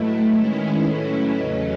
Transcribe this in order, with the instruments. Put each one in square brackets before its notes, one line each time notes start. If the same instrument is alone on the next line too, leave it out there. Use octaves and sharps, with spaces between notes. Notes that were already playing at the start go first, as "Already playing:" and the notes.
Already playing: [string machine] A2 F#3 A3 E4 [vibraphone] B4 D#5
[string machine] D#3 G#3 C#4 E4
[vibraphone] B4
[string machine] A2 F#3 C#4 E4 [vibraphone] A4 C#5
[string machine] E2 C#3 F#3 C#4 [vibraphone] B4 D#5